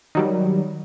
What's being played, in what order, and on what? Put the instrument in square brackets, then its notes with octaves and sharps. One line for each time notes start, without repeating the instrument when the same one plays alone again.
[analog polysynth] D#3 F#3 G3